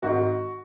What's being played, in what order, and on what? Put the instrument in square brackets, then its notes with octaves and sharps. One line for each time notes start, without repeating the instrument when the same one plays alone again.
[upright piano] G#1 G#2 D#3 F#4